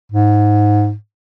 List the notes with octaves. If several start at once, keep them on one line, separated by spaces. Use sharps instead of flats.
G#2